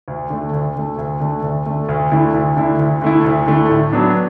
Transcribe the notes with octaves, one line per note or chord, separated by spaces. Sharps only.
D2
D3 A3
D2
D3 A3
D2
D3 A3
D2
D3 A3
D2
D3 A3 E4
D2
D3 A3 E4
D2
D3 A3 E4
D2
D3 A3 E4
A2
F#3 B3 D4